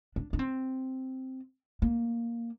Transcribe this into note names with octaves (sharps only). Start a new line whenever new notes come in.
D4
D4
C4
A#3